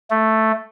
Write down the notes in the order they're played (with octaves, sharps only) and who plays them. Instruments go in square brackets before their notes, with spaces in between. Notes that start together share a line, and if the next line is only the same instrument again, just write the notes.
[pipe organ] A3